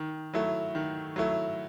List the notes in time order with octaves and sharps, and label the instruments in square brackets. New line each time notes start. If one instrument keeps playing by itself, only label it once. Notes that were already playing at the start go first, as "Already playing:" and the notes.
Already playing: [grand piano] D#3
F#3 A3 E4
D#3
F#3 A3 E4